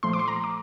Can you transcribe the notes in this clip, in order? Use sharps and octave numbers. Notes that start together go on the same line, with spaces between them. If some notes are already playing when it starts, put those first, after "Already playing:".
A#2 F3 A3 C6
D6
C6
A#5
D6